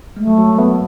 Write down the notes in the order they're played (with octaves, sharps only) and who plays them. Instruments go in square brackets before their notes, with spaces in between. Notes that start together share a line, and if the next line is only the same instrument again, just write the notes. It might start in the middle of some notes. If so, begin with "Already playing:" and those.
[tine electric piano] G#3 [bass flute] A3
[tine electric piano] F#3
F#3
[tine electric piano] F#3 [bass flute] B3